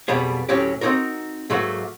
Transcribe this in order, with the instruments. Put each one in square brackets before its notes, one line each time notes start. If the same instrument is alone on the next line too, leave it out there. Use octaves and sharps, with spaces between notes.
[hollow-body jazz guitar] B1 F2 B2 G3 B3 G#4
D2 A2 F#3 C#4 G4
C4 C#4 D#4 F#4 A#4
G#2 F#3 A3 A#3 F#4